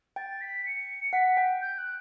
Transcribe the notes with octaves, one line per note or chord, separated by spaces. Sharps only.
G5 A6
B6
C#7
F#5 B6
G5
G6
F#6